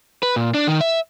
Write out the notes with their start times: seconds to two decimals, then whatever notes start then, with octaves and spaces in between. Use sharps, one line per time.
0.23 B4
0.36 A#2
0.54 D4
0.67 D#3
0.81 E5